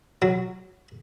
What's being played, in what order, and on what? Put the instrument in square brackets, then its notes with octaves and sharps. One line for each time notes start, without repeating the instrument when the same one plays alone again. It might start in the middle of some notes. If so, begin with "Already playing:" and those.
[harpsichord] F#3